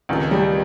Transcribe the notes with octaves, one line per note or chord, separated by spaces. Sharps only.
C#2 C3 D#3
G3